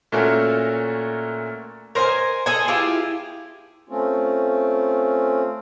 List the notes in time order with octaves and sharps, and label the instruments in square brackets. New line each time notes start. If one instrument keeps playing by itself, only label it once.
[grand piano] A#2 A3 C#4 F#4 A4 A#4
[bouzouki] A#4 C5 D#5 G#5
G#4 A4 D#5 G#5
E4 F4 G4 G#4
[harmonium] A3 C4 C#4 F4